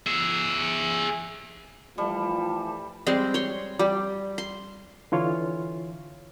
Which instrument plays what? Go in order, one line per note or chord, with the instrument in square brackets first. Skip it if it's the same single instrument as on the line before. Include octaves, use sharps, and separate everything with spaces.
[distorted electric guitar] G#4 E5
[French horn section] E3 F3 A3 [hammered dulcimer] G3 [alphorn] F4 [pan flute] A5
[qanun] G3 G#3 C4
C#5 C6
G3
C6
[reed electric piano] D3 E3 F4 C#5